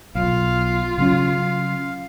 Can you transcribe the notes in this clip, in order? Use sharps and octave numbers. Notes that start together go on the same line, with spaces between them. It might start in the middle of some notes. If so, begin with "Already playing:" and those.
B1 F4 F5
C#3 F#3 C#4 F5